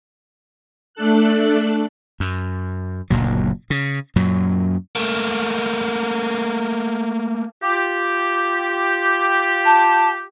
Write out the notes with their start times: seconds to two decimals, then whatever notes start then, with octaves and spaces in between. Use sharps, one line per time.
0.94 A3 D4 A4 F#6
2.20 F#2
3.10 F#1 D2 A#2 F#3
3.70 C#3
4.16 F#2 A#2 F#3
4.95 A3 A#3
7.63 F4 G4
9.65 A5